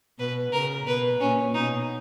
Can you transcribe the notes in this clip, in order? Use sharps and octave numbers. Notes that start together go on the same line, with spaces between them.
B2 B4
C#3 A#4
B2 B4
A#2 C#4
B2 D#4